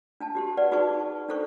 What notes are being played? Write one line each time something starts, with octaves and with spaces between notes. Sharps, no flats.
D4 G#5 A5
F#4 G4 C6
G4 B4 D5 F#5
D#4 F#4 G#4 B4 A5 C#6
D4 D#4 A4 C5 C#6